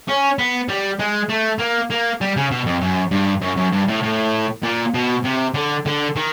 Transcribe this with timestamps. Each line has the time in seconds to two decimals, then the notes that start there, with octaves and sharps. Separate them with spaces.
0.08 C#4
0.38 B3
0.69 G3
0.99 G#3
1.30 A3
1.59 A#3
1.91 A#3
2.21 G3
2.36 C#3
2.51 B2
2.66 F2
2.81 F#2
3.11 G2
3.42 F#2
3.57 F#2
3.72 G2
3.88 A2
4.03 A2
4.63 A#2
4.94 B2
5.24 C3
5.54 D3
5.86 D3
6.16 D#3